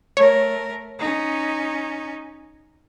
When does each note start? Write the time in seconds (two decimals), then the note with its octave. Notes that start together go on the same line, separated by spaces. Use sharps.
0.17 A3 A#4 C#5
0.99 C#4 D#4